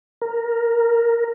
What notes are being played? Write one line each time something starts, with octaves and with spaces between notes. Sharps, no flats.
A#4